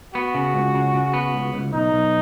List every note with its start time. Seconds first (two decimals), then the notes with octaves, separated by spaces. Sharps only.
0.15 B3 F#4
0.34 C#3
0.54 C#2
0.75 C#3
0.94 C#3
1.13 B3
1.34 C#2
1.54 C#2
1.73 B1 D#4
1.92 B1